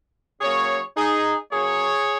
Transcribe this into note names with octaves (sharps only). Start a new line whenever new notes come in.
C#3 F#3 A#3 G#4 C#5
D#4 G#4
C#3 F#3 A#3 G#4 C#5